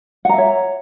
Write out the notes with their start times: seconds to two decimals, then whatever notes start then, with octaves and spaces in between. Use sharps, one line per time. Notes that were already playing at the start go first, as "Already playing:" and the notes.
0.25 F#5
0.29 A#5
0.34 E5
0.38 C#5